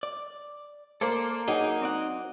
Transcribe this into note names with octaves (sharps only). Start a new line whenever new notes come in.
D5
A#3 A4 C5 D5
F#3 D#4 G#4 D5 G#5
C4 D5 F#5